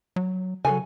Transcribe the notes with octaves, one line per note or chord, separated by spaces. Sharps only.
F#3
C#3 F#3 A4 G#5